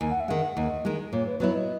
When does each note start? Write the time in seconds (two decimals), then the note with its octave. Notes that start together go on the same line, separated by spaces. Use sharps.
0.01 D#2 G#5
0.10 F#5
0.20 E5
0.28 D#3 G#3 F#5
0.57 D#2 D#5
0.85 D#3 G#3
1.12 A#2 C#5
1.26 B4
1.40 F#3 B3 E4 C#5
1.54 D#5